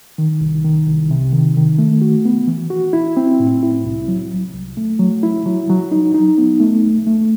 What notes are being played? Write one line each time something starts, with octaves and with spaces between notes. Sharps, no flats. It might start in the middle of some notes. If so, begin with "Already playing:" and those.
D#3
C2
D#3
C2
C3
D#3
D#3
A3
F#4
B3
E3
F#4
E4
C4
A2
E4
C2
F#3
C2
C2
A3
F#3
E4
F#3
F#3
D#4
D#4
B3
A3
C2
A3